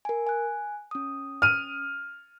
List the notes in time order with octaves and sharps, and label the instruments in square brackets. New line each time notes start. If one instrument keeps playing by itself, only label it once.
[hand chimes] A#4 G#5
G#5 F#6
C#4 D#6
[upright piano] F6 D#7